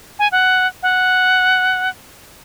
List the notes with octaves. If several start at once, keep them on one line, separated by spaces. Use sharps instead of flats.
G#5
F#5
F#5